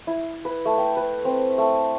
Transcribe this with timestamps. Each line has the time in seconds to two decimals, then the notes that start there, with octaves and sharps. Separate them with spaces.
0.07 E4
0.45 B4
0.65 A3
0.78 G5
0.97 B4
1.25 C4
1.58 A3